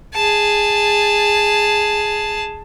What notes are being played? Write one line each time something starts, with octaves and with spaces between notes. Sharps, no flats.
G#4 A5